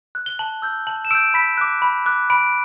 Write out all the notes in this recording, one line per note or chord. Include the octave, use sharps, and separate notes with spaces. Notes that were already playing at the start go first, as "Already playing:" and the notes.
F#6
G7
A5 F#7
E6 G6
A5 F#7
E7
E6 G6 D7
B5 B6
D6 F#6
B5
D6 F#6
B5 D7